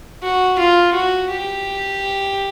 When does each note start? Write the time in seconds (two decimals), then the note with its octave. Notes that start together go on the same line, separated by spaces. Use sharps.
0.23 F#4
0.59 F4
0.94 F#4
1.31 G4